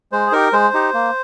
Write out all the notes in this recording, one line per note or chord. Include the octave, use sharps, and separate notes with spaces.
G#3 C5
G#4
D#4 G4 A#4
G#3 C5
D#4 G4
A#3